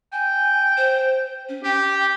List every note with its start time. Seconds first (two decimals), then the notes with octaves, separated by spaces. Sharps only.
0.13 G5 G#5
0.77 C5
1.49 C#4
1.64 G4 G5